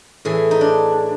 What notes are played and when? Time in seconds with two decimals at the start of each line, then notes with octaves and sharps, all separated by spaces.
0.25 A2 E3 G#4
0.51 D#4
0.61 D4